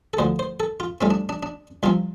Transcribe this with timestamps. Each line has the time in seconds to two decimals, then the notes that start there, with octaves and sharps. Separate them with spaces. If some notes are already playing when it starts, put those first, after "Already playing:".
0.14 A4
0.18 D2 D3 F3 C5
0.39 C5
0.60 A4
0.80 F4
1.01 C2 C3 A3 C4 F4
1.10 D4
1.29 D4
1.43 D4
1.83 C2 C3 F3 C4 F4